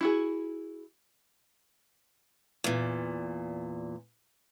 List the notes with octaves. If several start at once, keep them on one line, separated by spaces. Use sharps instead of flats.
E4 F#4 G#4
E2 A#2